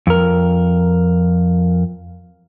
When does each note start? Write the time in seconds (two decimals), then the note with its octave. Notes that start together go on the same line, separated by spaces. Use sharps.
0.07 F2 A#4